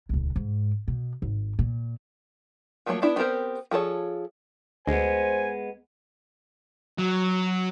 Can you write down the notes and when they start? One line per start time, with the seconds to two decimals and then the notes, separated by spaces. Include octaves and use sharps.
0.09 D#1 C#2
0.36 G#2
0.88 B2
1.22 G#1
1.59 A#2
2.86 F3 F#3 A3 A#3 C#5
3.02 B3 D4 E4
3.16 B3 C4 G4 A#4 C5
3.71 F3 G#4 A4 C#5
4.88 D2 G#3 B3 C5 G#5
6.99 F#3